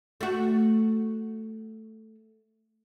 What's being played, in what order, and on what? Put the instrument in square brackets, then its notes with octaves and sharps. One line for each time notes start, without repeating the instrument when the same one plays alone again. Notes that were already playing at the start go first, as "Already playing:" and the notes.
[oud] A3 F#4